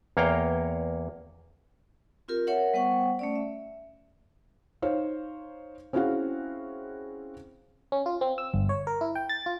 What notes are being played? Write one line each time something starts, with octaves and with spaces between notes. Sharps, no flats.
E2 A#3 C#5 F5 G5 A#5
C4 F4 G4 A#4
A#4 C#5 E5 F#5
G3 B3 C5 F#5 G5 C#6
A3 C#4 D5
E5
D#4 C5 C#5 F5
C4 C#4 E4 F#4 G#4 F5
C#4
F4
C4
E6
G1
C#5
A#4
E4
G5
A6
F4